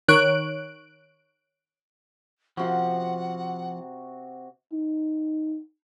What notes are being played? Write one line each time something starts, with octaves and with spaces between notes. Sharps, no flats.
D#3 C#5 F#6 D7
C3 F3 F#4 F#5
D#4